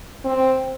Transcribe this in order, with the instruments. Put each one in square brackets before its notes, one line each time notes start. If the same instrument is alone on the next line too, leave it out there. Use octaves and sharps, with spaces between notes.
[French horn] C4